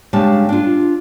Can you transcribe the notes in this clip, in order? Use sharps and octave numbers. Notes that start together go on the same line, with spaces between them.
G2 C#3 G#3 G4 F5 A5
D4 F4